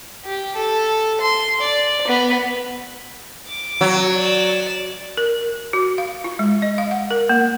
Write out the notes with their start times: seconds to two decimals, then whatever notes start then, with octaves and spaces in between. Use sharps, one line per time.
0.25 G4
0.55 A4
1.21 C6
1.61 D5
2.08 B3
3.47 D6
3.81 F#3
4.15 D5 E7
5.17 A#4
5.73 F#4
5.98 F5
6.24 F4
6.39 G#3
6.62 D#5
6.78 F5
6.91 F#5
7.11 A#4
7.29 A#3